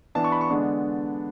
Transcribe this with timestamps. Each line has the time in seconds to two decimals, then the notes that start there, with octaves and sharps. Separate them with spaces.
0.15 E3 B3 D4 A5
0.24 C#6
0.32 B5
0.41 C#6
0.50 D3 G#3 B3 D4